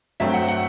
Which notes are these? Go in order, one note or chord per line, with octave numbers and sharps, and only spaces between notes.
G2 F#3 A3 C4 E5
G5
F#5
F#5